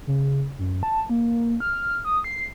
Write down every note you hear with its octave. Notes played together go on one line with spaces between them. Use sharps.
C#3
F#2
A5
A#3
F6
D#6
C7